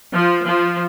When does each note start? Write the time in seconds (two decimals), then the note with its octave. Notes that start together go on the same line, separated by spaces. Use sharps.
0.13 F3
0.44 F3